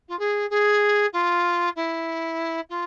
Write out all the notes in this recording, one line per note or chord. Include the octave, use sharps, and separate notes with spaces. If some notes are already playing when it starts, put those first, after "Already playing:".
F4
G#4
G#4
F4
E4
F4